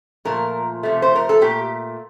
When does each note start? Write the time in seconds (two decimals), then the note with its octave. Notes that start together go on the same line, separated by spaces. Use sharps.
0.25 A#2 F3 A3 A#4
0.83 C3 F3 A3
1.02 C5
1.15 A#4
1.29 A4
1.41 A#2 A3 G4